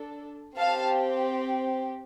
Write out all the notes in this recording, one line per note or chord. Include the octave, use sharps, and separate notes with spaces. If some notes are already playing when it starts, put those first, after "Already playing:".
Already playing: D4 A4
C4 G4 F5 A5